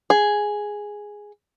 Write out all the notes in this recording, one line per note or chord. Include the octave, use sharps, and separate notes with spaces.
G#4